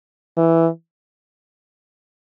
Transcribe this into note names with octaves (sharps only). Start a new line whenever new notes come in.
E3